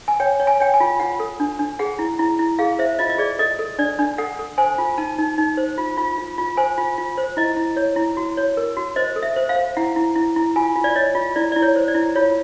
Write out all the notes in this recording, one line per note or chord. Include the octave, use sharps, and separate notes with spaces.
G#5
C#5 G5
C#5
G#5
C#5 G5
G#5
F4
F4 F#5
A4
D4
D4
G#4 F#5
E4
E4
E4
G#4 F5
C5 E5
F4 D#5
D#5
G#4 D5
A4 D#5
A4
D4 D5
D4
A4 F#5
A4
C5 G#5
F4
D#4 A5
D#4
D#4
C5
F4
F4
F4
F4
C5 G#5
F4
F4
C5
E4 D#5
E4
C#5
E4
F#4
C#5
A#4
F#4
C5 D#5
A4
E5
C5
F5
C5
E4 F#5
E4
E4
E4
F4 G#5
F4
D5
C#5 D#5
F4
E4 D5
E4 D5
C#5
C5
D5
E4
F4 C#5